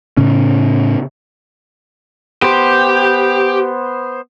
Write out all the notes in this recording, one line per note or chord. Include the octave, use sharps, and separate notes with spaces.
A2 C#3 C#4
B3 G4 C5